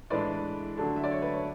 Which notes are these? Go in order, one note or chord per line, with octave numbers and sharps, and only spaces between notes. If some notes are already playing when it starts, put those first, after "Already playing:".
A2 E3 G#3 D4 B4 D5
D3 F#3 A3 D4
E5
D5
C#5
B4
C#5